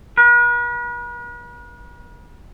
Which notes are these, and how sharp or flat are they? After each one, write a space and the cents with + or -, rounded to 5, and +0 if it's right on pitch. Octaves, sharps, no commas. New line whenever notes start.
B4 -45